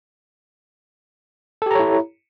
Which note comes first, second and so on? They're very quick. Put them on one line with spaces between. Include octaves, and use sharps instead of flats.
A4 G4 A#5 C#5 E4